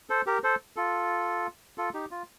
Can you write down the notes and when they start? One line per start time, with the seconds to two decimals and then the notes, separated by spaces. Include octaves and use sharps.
0.10 A4 C5
0.26 G4 A#4
0.44 A4 C5
0.76 F4 A4
1.78 F4 A4
1.94 D#4 G4
2.11 F4